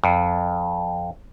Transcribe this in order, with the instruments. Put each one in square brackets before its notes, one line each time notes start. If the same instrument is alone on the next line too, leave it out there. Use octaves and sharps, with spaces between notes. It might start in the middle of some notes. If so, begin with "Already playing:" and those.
[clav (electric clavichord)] F2